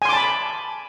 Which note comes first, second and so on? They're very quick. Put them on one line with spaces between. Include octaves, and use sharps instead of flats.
G#5 C6 D6 A5 B5